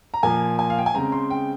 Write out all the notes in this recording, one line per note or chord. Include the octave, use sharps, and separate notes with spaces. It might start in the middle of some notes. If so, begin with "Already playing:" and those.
A#5
A#2 F3 A#3 G#5
G#5
F5
G5
G#5
C#3 G#3 C4 A#5
C6
G5